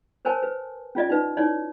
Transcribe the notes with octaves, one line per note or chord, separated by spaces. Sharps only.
A#4 C5 C#5 G#5 A5
B4
C#4 F4 D5 D#5
D#4 B4
D#4 E4 C#5 D5